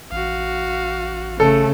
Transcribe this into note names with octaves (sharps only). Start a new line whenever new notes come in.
A1 F#4 F5
C#3 A3 A4